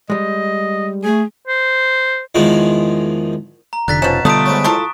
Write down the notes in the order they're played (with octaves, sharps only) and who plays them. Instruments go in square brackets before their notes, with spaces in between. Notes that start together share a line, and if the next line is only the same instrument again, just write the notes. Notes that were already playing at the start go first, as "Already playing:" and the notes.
[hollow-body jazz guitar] G3 G#3 [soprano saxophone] D#5
[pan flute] A3 [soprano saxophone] G#4
[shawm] C5
[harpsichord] E2 D#3 F3 G#3
[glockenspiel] A#5
[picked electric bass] F1 [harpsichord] D3 [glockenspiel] F#6 A6 B6
[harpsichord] B2 [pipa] F3 C#4 [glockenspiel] E7
[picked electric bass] D3 G3 B3 [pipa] A3 F4 [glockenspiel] D#6 D7
[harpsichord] G#2 B4 C#5
[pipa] E4 F4 A4 [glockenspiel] C#6